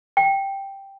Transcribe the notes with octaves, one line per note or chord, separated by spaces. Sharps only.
G5